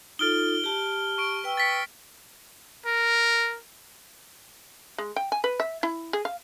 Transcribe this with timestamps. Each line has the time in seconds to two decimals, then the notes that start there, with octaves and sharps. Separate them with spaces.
0.19 D#4 F4 A4 F6 D7 G7
0.64 G4 A5
1.18 C#6 D7
1.44 B4 G5 E6
1.57 A6 B6 C#7
2.86 A#4
4.98 G#3
5.16 G5
5.32 G#5
5.44 B4
5.60 E5
5.83 E4
6.13 G#4
6.25 F5